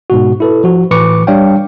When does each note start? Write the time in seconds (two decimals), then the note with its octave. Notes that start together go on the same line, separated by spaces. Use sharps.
0.10 G#2 B2 F#4
0.40 E4 A4 B4
0.64 F3 F#4
0.91 A2 E3 B4 C#6 D6 C#7
1.27 G3 D4 C#5 F5 G5